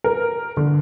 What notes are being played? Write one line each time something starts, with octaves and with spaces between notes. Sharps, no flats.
A#4
D3